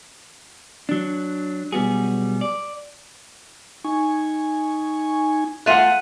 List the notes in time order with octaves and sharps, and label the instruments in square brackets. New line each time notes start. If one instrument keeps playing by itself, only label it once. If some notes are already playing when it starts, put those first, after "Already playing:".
[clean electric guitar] F#3 D4
B1 G3 B3 F#4 G#4
D5
[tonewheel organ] D#4 G#5 C#6
[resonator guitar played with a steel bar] A3 F4 [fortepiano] E5 F#5 [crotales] F#6 D#7